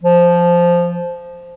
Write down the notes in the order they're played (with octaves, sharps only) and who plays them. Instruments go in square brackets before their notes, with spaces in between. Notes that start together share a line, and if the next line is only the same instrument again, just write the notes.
[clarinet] F3